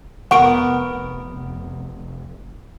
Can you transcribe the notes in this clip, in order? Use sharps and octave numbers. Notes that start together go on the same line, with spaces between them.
F1 B3 A#4 F#5 C#6 D7